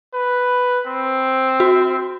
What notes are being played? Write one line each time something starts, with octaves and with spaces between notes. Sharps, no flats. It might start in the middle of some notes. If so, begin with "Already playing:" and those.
B4
C4
F#4